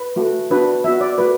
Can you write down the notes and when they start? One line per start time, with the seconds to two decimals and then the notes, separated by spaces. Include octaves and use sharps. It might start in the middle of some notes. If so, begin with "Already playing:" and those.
Already playing: B4
0.16 A3 F#4
0.50 B3 D4 F#4 B4
0.84 B3 F#4 E5
1.01 D5
1.18 A3 F#4 B4